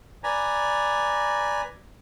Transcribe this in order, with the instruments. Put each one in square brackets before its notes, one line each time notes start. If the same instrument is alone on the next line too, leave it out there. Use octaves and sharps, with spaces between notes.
[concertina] B4 D5 G#5 A#5